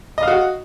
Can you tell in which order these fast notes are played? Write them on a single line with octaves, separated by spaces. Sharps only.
D#5 F5 F#4